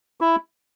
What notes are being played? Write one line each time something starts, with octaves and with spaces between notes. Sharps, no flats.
E4